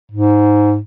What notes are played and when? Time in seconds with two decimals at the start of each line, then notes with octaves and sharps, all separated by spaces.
0.12 G#2